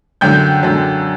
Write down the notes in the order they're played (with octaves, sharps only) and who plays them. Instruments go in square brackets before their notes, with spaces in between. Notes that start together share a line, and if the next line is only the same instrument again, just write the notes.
[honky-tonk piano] F#2 D3 F#3 G5 G6
F#2 D3 F#3